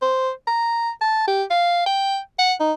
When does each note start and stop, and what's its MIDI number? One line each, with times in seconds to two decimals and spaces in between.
0.02 0.31 72
0.47 0.90 82
1.02 1.23 81
1.28 1.44 67
1.51 1.84 77
1.86 2.18 79
2.39 2.54 78
2.60 2.73 63